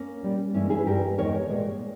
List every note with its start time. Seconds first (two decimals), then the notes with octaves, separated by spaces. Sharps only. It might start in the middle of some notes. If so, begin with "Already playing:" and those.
Already playing: A#3 C#4
0.22 A#2 G3
0.54 G2 E3 G#3 C#4 E4
0.70 E4 G#4
0.78 B4
0.86 G2 G3 G4 A#4
1.18 E2 D#3 G#3 A#4 C#5
1.50 A#2 G#3